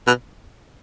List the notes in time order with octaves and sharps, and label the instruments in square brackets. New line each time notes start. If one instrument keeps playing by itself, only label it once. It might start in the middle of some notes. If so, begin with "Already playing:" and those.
[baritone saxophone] B2